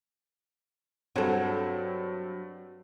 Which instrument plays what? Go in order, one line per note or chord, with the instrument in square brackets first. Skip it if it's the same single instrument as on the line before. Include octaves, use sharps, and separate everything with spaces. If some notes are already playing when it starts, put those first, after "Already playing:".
[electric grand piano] G2 C4 [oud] F#3 A4